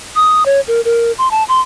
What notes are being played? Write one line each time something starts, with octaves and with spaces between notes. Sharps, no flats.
D#6
C#5
A#4
A#4
C6
A5
C6